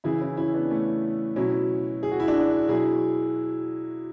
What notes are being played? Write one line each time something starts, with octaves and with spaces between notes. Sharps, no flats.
C#3 E3 E4 G#4
C#4 E4
C#4 E4
B3 D4
A3 C#4
B2 F#3 C#4 E4
G#4
F#4
E4
D4 F#4
B2 F#3 E4 G#4